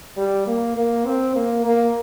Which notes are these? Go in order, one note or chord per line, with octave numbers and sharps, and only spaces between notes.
G3
A#3
A#3
C4
A#3
A#3